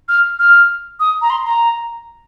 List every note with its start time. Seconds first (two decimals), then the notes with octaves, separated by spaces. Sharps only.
0.09 F6
0.39 F6
1.00 D#6
1.22 A#5
1.30 C6
1.45 A#5